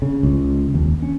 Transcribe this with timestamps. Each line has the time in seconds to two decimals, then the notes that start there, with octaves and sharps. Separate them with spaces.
0.02 C#3
0.23 C#2
0.74 D#2
1.02 C#4